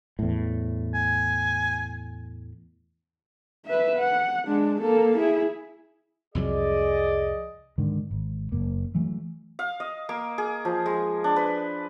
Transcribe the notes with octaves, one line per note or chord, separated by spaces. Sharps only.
E2 A2
G#5
B4 E5
F#5
G#3 D4
A#3 A4
E4 G#4
C2 F2 F#3 G#4 D5 D#5
G#2 D3 D#3
G#1
F#1 A#3
E3 F#3 A3
F5
D#5
A#3
G#4
F3
G#3
D4
B4